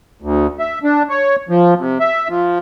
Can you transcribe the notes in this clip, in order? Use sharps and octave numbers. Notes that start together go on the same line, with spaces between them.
D2
E5
D4
C#5
F3
C3
E5
F3